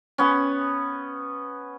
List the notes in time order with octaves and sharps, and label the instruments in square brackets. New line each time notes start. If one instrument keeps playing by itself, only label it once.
[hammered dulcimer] B3 C#4